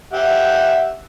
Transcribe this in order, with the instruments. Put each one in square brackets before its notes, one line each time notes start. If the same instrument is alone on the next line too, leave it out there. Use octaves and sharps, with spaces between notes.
[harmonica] G4 E5 F#5